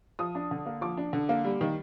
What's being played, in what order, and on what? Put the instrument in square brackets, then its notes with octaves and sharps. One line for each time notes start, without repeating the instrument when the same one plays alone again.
[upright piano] F3 D#6
D4
D3
A#3
F3 D6
D4
D3
A#3
G3
D#3